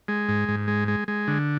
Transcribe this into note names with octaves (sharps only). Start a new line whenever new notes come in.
G#3
G#2
G#2
G#3
G#3
G#3
D3